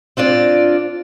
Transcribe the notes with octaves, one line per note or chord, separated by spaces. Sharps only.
C4 D4 F4 D5